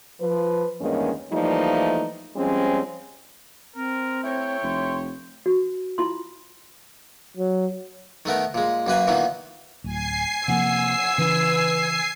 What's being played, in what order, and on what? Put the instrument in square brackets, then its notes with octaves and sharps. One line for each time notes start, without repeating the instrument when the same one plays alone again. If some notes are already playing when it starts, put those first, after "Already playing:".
[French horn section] F3 B4
E2 G2 D#3 G#3 A#3 C#4
E3 F3 G3 A3 A#3 D#4
F3 G3 G#3 C4 C#4
[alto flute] C4 [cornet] A#4
[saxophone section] A3 E4 C#5 [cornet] G5
[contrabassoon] F1 [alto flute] C6
[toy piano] F#4
E4 F4 C6
[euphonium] F#3
[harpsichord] D#3 A3 B3 A#4
A#2 G#3
F#2 A#3 B4 G#5
A#2 D#3 E3 B3
[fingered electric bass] D1 [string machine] G#5 C7
[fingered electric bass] C3 F3 A#3 [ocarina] F#5 [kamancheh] E6
[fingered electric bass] C#3 E3 [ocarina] B4